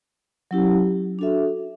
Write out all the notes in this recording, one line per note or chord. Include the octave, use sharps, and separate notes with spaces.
F#3 C#4 E4 G4
D4 F#4 A4 E5